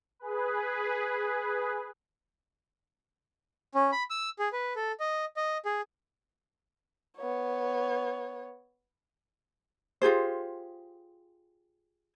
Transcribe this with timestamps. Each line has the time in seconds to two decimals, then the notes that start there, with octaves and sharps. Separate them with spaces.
0.19 G#4 B4
3.75 C#4
3.92 B5
4.10 E6
4.39 G#4
4.53 B4
4.76 A4
5.00 D#5
5.37 D#5
5.65 G#4
7.18 B3 C#5
10.02 F4 G4 G#4 C5